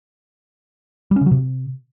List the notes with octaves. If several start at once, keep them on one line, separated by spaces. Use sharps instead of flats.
G3
C#4
C#3
F#3
C3